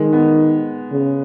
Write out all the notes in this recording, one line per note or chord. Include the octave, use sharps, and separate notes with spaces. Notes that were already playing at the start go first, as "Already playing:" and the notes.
Already playing: D#3 G#3
B3
C#3